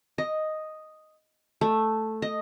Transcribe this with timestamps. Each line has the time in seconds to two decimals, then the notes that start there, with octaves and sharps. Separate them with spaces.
0.18 D#5
1.61 A3
2.22 D#5